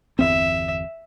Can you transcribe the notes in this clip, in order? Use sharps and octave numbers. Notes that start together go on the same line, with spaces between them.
G1 E2 C4 E5